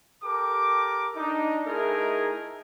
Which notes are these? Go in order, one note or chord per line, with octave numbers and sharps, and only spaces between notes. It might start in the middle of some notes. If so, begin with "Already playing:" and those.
G4 A4 A#4 D6
D4 D#4
A3 D#4 E4 G#4 A#4